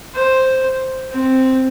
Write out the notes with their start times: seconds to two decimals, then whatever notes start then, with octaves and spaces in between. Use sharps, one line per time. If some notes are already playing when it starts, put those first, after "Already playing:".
0.15 C5
1.11 C4